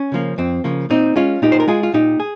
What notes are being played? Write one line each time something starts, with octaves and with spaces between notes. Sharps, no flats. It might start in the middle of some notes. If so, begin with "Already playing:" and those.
Already playing: C#4
C#3 F3 A#3
F2 C4
C#3 F3 A#3
A#2 C4 D#4
G#3 C#4 F4
A#2 D#4 G4
C5
A#4
G#3 F4 G#4
F4
A#2 D#4 G4
G#4